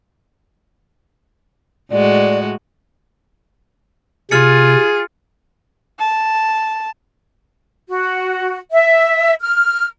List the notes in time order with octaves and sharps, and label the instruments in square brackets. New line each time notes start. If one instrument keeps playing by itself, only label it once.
[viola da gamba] A2 G#3 F#4 [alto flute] D5
[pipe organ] C3 [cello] F4 [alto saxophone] G#4 [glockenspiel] F6 A6 C#7
[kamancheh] A5
[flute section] F#4
E5
F6